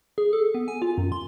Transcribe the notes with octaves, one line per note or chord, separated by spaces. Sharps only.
G#4
A4
B3
G#5
F4
F#2
C6